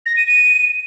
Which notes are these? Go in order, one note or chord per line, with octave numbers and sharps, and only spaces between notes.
A#6
D#7
D#7